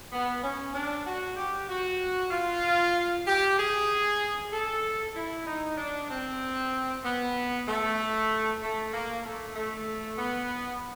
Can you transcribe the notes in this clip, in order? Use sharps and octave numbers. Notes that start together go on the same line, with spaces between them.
B3
C#4
D4
F#4
G4
F#4
F4
G4
G#4
A4
E4
D#4
D4
C4
B3
A3
A3
A#3
A3
A3
B3